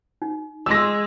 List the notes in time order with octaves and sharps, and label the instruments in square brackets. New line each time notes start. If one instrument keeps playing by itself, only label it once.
[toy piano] D#4
[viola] G#3 [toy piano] C6 D6 [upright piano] E6 A#6